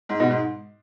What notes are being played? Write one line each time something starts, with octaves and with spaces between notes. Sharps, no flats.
G#2
B2
G#2